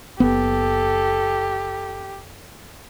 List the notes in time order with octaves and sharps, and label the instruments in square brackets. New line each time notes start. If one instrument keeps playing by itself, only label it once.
[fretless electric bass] F#1 B3 [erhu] G4 [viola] A4